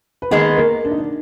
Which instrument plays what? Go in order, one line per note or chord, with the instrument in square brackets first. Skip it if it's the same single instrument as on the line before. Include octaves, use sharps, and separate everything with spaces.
[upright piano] B4
[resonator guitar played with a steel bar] D#3 G#3 B3 [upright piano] A#3 A#4
[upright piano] A#3 A#4
D4
D#4
D4